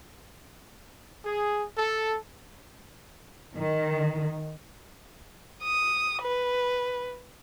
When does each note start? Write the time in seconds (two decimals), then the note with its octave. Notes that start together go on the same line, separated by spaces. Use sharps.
1.25 G#4
1.77 A4
3.55 D#3
5.63 D#6
6.22 B4